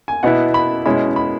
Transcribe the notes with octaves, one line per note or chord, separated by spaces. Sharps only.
G#5
B2 B3 E4 F#5
B5
B2 G#3 C#4 E4 B5
B5